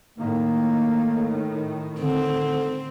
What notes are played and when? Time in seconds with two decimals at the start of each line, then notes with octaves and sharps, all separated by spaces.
0.18 A2 D#3 A#3
2.00 D3 C4